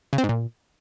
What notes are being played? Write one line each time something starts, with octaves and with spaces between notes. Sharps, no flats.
C#3
C4
G#2
A#2